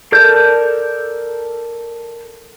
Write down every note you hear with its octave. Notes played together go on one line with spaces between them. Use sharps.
A4 A#4 D5 G6